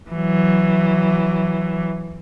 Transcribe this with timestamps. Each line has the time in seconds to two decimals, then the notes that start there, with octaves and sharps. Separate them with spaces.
0.10 E3 F#3